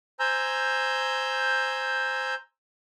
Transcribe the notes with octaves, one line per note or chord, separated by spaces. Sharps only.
C5 G#5 A#5 E6 G6